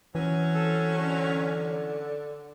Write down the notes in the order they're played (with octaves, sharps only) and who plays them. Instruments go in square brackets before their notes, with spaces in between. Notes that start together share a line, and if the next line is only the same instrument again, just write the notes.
[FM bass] E3 [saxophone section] F#3 C4 C#4
[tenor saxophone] A4
D3